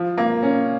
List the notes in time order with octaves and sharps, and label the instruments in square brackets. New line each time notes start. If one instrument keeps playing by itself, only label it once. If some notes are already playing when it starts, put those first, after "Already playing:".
Already playing: [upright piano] F3 F4
A#3
C#4